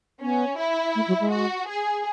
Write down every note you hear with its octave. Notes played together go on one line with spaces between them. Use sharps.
B3 C#4
E4
A3
F#3
G#3
F#4
G#4